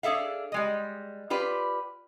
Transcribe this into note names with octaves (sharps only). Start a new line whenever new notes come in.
D4 G#4 A4 E5 F5
G3 G#3 D#5
F4 G4 B4 D5